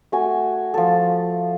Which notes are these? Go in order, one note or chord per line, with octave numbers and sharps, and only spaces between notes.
A3 F#4 G#5
F3 A4